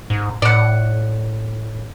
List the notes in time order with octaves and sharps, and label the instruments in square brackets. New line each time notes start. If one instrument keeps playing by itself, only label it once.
[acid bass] G#2
[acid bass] A2 [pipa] D5 F#5